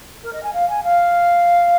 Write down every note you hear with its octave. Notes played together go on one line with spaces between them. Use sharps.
A#4
D#5
G#5
F5
G#5
F5